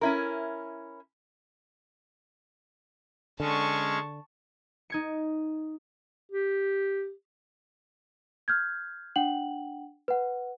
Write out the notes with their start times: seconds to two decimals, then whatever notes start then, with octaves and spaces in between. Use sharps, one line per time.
0.01 C#4 E4 A#4
3.40 D3 G#3 C#4 A5 C#6
4.90 D#4 G#6 C#7
6.32 G4
8.48 F6 G6 G#6
9.16 D4 F#5 G5 F#7
10.08 B4 F#5